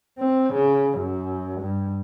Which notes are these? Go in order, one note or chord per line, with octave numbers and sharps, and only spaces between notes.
C4
C#3
F#2
G2